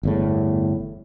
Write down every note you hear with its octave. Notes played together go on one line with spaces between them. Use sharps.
G1 E2 A2